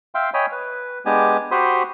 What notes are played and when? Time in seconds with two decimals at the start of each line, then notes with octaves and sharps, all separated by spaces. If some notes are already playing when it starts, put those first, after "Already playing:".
0.15 E5 F5 G5 C6
0.34 C#5 D#5 G5 G#5 B5
0.52 B4
1.06 G#3 B3 D4 G4 G#5
1.51 F#4 G4 C5 B5 C6 D#6